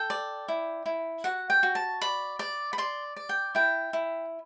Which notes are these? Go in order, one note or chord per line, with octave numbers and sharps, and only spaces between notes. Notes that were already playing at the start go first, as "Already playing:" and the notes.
Already playing: A4 G5
D5
E4
E4
F#4 F#5
G5
F#4
A5
D5 B5
D5
B5
D5 C6
D5
G5
E4 G5
E4